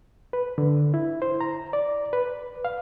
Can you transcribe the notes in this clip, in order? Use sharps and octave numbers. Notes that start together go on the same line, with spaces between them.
B4
D3
E4
C5
A#5
D5
B4
F5